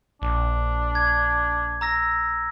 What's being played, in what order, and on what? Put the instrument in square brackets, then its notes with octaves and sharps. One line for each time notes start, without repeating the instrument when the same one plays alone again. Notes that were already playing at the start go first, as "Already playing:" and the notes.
[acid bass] A#1 [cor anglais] D4
[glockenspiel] G#6
A#5 E6 A#6